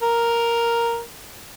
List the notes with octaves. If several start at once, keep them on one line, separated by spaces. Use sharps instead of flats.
A#4